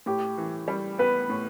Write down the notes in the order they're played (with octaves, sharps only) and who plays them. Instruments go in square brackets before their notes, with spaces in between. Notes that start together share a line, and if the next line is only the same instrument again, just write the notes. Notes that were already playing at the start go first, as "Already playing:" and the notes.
[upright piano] A2 [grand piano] G4
[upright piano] E3
G3
[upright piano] B3 [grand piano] B4
[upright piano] A2